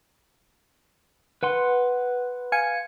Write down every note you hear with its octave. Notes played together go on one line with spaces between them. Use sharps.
B4 F#5 C6
F5 G#5 C#7